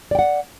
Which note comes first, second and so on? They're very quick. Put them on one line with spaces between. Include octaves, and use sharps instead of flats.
D5 G5 F#5